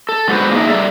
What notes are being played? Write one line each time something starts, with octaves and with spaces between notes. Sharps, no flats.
A4
D3 G#3 B3 F#4 B4 C5
A#3 D4 D#4 G#4 D#5 E5
G3 A4 D5 E5